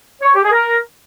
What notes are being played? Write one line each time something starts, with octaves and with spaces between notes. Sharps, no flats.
C#5
G4
G#4
A#4